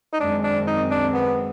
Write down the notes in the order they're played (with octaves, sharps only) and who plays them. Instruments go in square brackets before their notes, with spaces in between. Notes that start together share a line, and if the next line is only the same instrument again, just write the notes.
[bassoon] D#4
[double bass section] F#2 D#3 G#3 C4 [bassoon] D4
[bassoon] D4
D#4
D4
B3